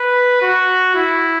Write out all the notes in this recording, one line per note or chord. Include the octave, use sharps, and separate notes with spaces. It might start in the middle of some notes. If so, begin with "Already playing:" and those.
Already playing: B4
F#4
E4